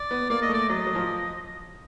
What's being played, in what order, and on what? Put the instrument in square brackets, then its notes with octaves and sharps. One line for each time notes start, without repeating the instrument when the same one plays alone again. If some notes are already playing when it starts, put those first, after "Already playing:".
Already playing: [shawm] D5
[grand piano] B3
[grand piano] A#3 [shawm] D5
[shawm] D#5
[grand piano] A3 [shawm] D5
[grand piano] F#3 [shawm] D#5
[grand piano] F#3
F3